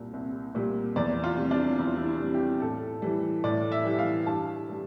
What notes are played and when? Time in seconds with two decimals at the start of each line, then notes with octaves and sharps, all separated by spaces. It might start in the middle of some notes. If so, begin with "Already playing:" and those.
Already playing: C2 A#2 G3
0.13 C2
0.55 A#2 G3
0.96 E2 D5
1.24 F4
1.37 C3 G3
1.51 D4
1.79 E2 E4
1.87 F4
1.96 E4
2.06 E4
2.20 C3 G3
2.34 G4
2.61 A2 A4
3.02 E3 G3
3.44 A2 D5
3.72 E5
3.85 E3 G3
3.99 F5
4.26 G2 A5
4.68 E3 G3